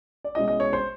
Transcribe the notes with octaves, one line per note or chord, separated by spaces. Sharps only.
D5
B2 G#3 C#4 E4 D#5
D#5
C#5
C5